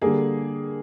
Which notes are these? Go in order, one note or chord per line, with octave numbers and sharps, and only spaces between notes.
D3 G3 A#3 G#4